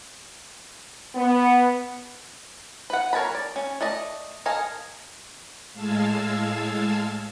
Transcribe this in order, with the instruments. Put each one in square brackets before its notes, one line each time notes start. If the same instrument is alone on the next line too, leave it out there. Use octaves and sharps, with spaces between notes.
[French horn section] B3
[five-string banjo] B4 F#5
A#3 A#4 C#5 A5 B5
D5
C#4
A3 D5 D#5
A4 A#4 D#5 F5 G#5
[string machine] A2 G#3 F5 A5 E6 G#6